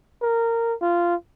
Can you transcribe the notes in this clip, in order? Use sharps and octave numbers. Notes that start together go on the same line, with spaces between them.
A#4
F4